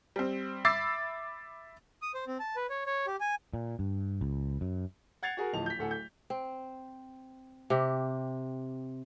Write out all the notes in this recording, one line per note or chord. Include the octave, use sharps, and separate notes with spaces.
G3 C4
E5 B5 D6 E6 A6 C7
D#6
C5
C4
A5
B4
C#5
C#5
G4
G#5
A#2
G2
C#2
F#2
F#5 G#6 A6 C7 F7
F#4 G#4 A#4
D1 F3 D#4 A5 F7
G6 B6
D1 A4 F#5 G#5
G6
C4
C3 G4